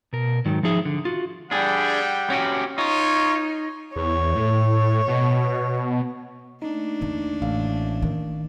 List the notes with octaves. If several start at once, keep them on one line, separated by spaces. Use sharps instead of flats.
B2 A#4
G#2 D#3 F#3
F3 D#4 G#4 E5
D3
F4 F#4
G3 D4 G#4 F#5 G5
C#4 F#4 G4
D#4 F4 C#5
E2 C#5
A2
B2
A3 A#3 D4 D#4
E2 D3
A1 F5
D#3